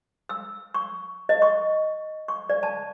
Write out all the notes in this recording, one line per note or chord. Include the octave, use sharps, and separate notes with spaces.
E6
C#6
D#5
C#6
C#6
D5
A5